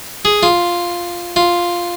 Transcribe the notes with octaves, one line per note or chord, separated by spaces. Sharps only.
G#4
F4
F4